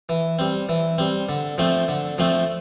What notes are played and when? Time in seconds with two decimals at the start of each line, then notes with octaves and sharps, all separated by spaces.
0.09 E3
0.39 G3 C4
0.69 E3
0.98 G3 C4
1.29 D3
1.58 F3 A3 C4
1.88 D3
2.18 F3 A3 C4